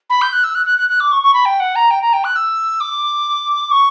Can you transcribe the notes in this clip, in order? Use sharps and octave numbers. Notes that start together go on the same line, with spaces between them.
B5
G6
F#6
E6
F#6
F#6
F#6
F#6
D6
C#6
C#6
B5
G5
F#5
A#5
G5
A#5
G5
F#6
E6
D6
C#6